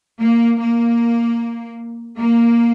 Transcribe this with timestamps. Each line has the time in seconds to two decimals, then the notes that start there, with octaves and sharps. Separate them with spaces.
0.20 A#3
0.60 A#3
2.18 A#3